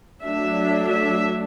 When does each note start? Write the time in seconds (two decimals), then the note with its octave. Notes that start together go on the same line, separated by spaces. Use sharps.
0.24 F#3 A3 D4 E5
0.90 E5